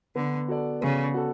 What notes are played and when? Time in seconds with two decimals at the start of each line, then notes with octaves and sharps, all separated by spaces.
0.15 D3 B3
0.48 F#4 A4 D5
0.81 C#3 B3
1.14 F#4 A4